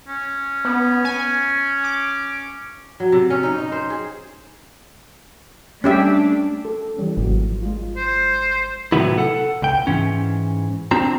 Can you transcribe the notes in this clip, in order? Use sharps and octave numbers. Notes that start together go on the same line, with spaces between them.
C#4
B3
G#5
D6
F#3
C3
C#4
D#4
D#4
C5
G#4
G3 A3 C#4 D4 G4 E5
A4
E3 G3 C#4
G#1 F3 F#3 A#3
G#3 F4
C5
A2 C3 D#3 F#3 B3 E4
A4 F#5
C#2 G5
G#2 E3 C#4
C4 D4 F4 A#5